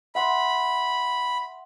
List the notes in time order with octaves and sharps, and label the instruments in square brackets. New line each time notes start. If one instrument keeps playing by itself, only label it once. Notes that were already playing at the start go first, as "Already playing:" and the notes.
[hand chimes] E5 F#5 C6 [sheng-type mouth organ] B5